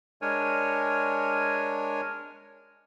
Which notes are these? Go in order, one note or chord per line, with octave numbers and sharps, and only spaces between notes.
G#3 D4 A#4 C#5 G#5